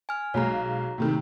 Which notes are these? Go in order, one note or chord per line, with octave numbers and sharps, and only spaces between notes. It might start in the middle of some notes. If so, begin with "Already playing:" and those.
G#5 F6
B1 G#3 C#5 F5 A#5
A2 C3 D#3